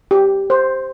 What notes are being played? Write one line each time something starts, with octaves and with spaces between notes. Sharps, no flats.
G4
C5